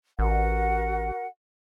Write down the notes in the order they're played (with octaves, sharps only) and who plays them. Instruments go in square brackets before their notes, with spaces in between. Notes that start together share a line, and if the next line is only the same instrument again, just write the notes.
[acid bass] A1 [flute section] F#4 A#4 F#5